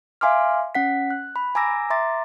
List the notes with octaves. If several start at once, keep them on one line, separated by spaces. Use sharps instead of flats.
E5 F5 G#5 C6 D6 F6
C#4 F#5 B6
F#6
B5
G#5 A#5 D6 E6 A#6
E5 A#5 C6 D6 A6